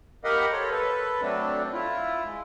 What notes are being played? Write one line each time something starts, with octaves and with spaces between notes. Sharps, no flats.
G4 A#4 D#5 F5 F#5 B5
A4 C5 C#5
A4 B4
F#3 A3 C4 D4
E4 F4
G#3